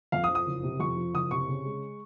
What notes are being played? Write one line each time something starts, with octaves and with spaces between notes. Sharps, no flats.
F2 F5
D#6
F3
D#6
F#1
C3
F2 C#6
F3
F#1 D#6
C3 C#6
C#3
G#3